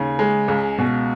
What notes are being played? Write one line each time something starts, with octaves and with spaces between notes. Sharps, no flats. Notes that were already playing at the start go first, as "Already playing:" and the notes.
Already playing: D#2 C#3 G#5
G#3
C#2
B2